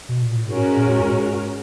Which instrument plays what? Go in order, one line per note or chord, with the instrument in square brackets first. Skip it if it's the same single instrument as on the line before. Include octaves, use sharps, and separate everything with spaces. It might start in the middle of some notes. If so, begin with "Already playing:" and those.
[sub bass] B2
A#2
A2
[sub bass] G#2 [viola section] G#3 C#4 F#4 A#4
[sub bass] A#2
A2
G#2